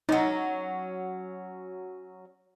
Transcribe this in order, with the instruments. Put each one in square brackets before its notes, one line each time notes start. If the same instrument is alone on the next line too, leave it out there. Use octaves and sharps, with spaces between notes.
[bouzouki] F#3 C#4 [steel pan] D#4